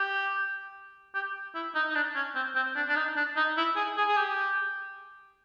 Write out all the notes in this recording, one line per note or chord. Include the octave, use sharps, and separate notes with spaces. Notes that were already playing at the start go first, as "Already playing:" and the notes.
Already playing: G4
G4
E4
D#4
D#4
D4
C#4
C4
C4
D4
D4
D#4
D4
D#4
E4
G#4
G#4
G#4
G4